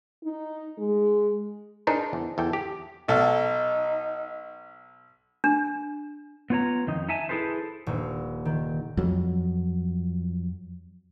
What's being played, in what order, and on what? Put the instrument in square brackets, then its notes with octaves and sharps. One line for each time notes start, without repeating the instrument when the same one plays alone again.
[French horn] D#4
G#3
[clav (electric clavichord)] D4 D#4 G#4 A#4 C5
E2
E2 A4 G5
G4
[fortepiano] B1 A4 [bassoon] D#4
[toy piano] D4
[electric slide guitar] B3 F4 C#5 A#5
F2 D#3 D#4
D#4 E5 G#5 A5
E4 G#4 A4 B4 C5
[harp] D#1
D#3
[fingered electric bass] F2 F#3